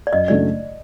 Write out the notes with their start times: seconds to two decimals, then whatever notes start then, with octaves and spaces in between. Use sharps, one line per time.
0.07 D5
0.12 F#2 D#5
0.28 C#3 F#3 A3 D4 D5